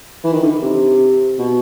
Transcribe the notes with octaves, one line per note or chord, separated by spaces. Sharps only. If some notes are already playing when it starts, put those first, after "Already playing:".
E3
D#3
D3
C3
B2